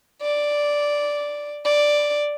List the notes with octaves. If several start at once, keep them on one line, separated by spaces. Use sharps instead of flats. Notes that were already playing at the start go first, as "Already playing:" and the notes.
D5
D5